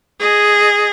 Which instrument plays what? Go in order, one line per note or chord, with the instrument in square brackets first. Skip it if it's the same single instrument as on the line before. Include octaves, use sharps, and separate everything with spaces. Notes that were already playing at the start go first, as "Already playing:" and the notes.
[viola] G#4 D#5